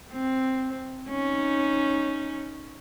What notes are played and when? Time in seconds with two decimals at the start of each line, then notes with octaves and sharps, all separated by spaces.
0.12 C4
1.10 C#4 D#4